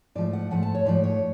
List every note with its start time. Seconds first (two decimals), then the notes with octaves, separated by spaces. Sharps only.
0.15 G#2 F3 A3 D5
0.33 F#5
0.51 G#2 F3 A3 F#5
0.62 A5
0.75 C#5
0.85 G#2 F3 A3 D5
1.04 C#5